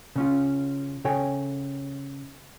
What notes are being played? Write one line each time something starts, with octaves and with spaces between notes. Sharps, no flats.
C#3 C#4 F4
C#3 A4 C#5 G5 G#5